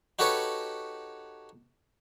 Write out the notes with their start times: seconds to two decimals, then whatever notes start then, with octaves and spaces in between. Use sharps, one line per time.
0.19 D#4 F#4 G4 A4 B4 C#5